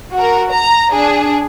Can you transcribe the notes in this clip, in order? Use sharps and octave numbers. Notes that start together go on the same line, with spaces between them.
F#4 A#4
A#5
D4 G#4